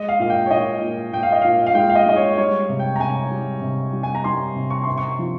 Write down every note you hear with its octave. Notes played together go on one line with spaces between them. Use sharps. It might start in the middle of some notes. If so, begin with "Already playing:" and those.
Already playing: G#3 D#5
F5
A#2 F5
G5
C#5
A#2 D#5
A#2
A#2 G5
F5
D#5
A#2 F5
F5
G#3 G5
F5
D#5
G#3 D#5
C#5
G3 C#5
C3
G5
A#5
C3 G#5
G3
C3
G3
G#5
A#5
G3 C6
C3
C#6
C3 C6
C#6
F3